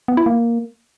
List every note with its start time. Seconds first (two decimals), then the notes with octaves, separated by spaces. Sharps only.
0.08 B3
0.17 E4
0.26 A#3